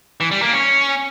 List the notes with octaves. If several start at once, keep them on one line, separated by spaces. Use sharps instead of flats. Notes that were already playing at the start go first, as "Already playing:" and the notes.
E3
G3
A#3
C#4